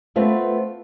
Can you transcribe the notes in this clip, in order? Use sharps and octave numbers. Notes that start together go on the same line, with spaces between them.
A3 B3 C4 F4